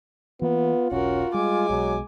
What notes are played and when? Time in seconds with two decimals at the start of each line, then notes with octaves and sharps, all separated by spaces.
0.42 E3 A#3 B3 F4
0.91 E1 B1 C#4 F#4 A#4
1.34 G3 G#3 G#5 D6
1.69 B1 B2 F#3